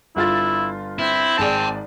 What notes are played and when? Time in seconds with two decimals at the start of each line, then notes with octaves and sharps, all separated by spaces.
0.16 G1 E4 F4 A6
0.99 C4 E4
1.38 G#1 G#4 D5 G5 A5